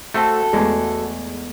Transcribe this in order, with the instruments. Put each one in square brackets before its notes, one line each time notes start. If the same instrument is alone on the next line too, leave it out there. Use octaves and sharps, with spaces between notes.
[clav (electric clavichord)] A3 C4 [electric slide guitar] F#4 A4
[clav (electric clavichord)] E2 [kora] G#3 A3